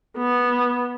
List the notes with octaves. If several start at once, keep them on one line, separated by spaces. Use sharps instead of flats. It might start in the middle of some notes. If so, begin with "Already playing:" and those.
B3